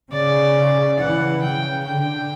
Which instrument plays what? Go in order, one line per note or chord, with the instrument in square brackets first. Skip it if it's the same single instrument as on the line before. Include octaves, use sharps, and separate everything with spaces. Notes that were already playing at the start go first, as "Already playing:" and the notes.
[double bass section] C#3 [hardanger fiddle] D5
[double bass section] E3 [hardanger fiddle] F#5
[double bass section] C#3 [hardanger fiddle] G5
[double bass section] D3 [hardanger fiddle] G5